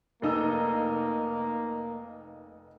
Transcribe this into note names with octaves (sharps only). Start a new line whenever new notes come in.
F1 A#3 D#4 E6